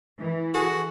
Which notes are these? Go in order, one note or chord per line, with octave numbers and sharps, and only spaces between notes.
E3
F#4 G#4 A4 A5